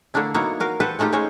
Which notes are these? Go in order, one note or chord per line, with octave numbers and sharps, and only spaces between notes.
D3 A3 A#3 D4 E4
F#3 A#3 B3 D#4 E4 C#5
F#4 A#4 F5
G4 A4 B4 C5 F#5
G#3 A3 D#4 F4 G4
G#3 C#4 D#4 C5 C#5 D#5